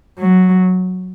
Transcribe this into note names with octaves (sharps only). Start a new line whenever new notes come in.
F#3